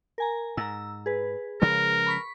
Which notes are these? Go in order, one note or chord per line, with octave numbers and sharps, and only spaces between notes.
A#4 G#5 A#5
G#2 A#5 E6
G#4 B4
C#3 F3 G#3 A#4
B5 C#6 B6